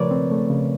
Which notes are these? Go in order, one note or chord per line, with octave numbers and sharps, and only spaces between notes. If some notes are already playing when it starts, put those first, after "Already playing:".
Already playing: C#3 F3 A3 A#4 B4 C#5 D5
C4
A3
C#3